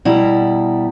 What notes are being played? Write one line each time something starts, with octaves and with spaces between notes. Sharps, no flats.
B2 G3 E4 A#5